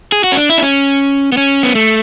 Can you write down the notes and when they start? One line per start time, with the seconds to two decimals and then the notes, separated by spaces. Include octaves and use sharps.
0.12 G#4
0.24 F#4
0.32 C#4
0.37 D4
0.49 E4
0.58 D4
0.62 C#4
1.32 B3
1.37 C#4
1.63 B3
1.75 A3